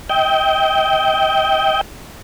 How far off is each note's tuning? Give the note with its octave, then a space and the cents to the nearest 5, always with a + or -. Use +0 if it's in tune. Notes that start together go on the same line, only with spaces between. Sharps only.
D#5 +35 G5 -5